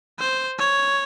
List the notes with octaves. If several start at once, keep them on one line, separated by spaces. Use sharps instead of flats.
C5
C#5